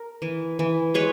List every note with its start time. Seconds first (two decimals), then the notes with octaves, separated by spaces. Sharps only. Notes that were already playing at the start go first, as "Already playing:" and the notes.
Already playing: A#4
0.22 E3
0.59 E3
0.94 G#3 B4 C#5